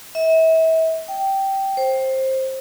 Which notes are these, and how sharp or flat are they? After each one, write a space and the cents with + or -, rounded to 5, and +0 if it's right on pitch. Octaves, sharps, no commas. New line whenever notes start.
E5 -35
G5 -10
C5 +15